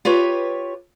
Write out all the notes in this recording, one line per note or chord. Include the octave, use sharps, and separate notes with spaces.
F4 G4 B4 C#5